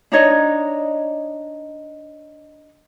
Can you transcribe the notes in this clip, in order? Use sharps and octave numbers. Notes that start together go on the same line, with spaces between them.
D4 D#4 C#5 D#5